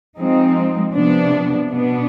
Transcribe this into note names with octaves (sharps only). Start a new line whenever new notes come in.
F3 G#3 C4 D#4
C3 F3 B3 D4
B2 B3 D4